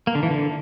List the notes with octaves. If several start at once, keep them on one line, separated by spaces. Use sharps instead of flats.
A#3
D3
E3
D3